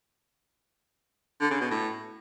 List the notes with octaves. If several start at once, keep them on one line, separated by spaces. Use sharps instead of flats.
D3
C#3
B2
A2